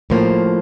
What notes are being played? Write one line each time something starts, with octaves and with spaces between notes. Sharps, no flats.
A2 F3 A#3 C5